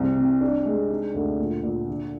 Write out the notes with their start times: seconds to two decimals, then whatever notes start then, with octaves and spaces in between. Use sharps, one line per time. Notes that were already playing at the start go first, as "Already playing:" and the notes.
Already playing: C2 C4
0.17 C3
0.41 D4
0.65 G#3
0.90 D#4
1.14 D2
1.39 A#2
1.63 A#2
1.88 D3